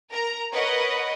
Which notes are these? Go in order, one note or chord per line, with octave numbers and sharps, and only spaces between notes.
A#4 A#5
A#4 B4 C#5 D#5 F#5 B5